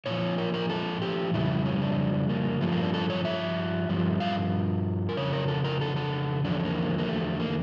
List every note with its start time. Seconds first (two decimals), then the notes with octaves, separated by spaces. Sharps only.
0.06 A#2 F3 C#5
0.38 A#4
0.54 A#4
0.69 A4
1.02 G4
1.34 F2 C#3 G3 E4
1.65 C#4
1.81 D4
2.29 A#3
2.61 G2 F3 A3
2.72 A#3
2.83 D4
2.94 A4
3.10 C#5
3.25 E5
3.89 G2 F3
4.20 F5
5.09 A#4
5.16 F2 C#3 C#5
5.33 A#4
5.48 A4
5.65 A#4
5.81 A4
5.96 A4
6.44 E2 D3 F3 D4
6.55 C#4
6.65 A#3
6.98 A#3
7.08 A3
7.40 A#3